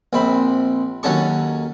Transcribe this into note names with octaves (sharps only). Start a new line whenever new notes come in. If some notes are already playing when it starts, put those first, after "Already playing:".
A#1 C4 B5
D#2 F#3 C#4 A4 C#6